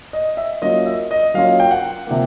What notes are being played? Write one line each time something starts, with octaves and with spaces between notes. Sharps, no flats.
D#5
E5
F#3 A#3 C#4 F4 D#5
E5
D#5
F#3 A#3 C#4 F4 F5
G5
F#5
C3 F3 A#3